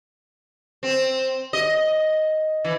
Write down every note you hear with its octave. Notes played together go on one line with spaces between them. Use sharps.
C4
D#5
E3